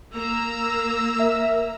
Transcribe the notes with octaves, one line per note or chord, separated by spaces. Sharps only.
A#3 A#5 E6
A#4 E5